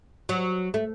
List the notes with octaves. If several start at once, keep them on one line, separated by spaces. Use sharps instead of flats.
F#3
A3